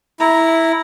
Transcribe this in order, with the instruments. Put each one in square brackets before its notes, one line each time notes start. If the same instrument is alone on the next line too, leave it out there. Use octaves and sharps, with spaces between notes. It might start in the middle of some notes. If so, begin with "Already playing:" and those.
[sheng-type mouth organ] E4 [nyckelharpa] A#5